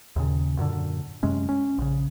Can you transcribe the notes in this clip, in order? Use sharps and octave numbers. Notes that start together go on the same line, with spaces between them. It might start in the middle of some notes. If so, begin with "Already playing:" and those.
D#2 A#2 C#3
F#2 A#2 D3
F#2 C3 G#3 C#4
C#4
A#1 C#3